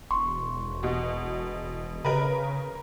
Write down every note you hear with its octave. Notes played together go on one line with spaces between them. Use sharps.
E1 C6 C#6
B2 F#4
C#3 A#4 B4